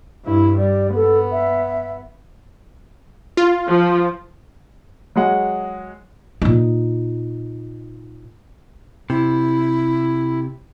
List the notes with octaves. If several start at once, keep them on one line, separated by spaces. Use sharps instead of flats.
G2 E4
G3 D5
B3 A4
E5
F4
F3
F#3 G#3 F#5
A#2 D#4
C3 E4